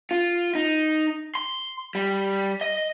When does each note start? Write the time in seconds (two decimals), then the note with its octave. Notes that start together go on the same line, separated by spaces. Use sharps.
0.11 F4
0.55 D#4
1.35 C6
1.95 G3
2.61 D#5